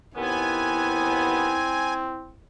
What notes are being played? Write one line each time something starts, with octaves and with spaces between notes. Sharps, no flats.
D#2 B3 C4 E4 G#5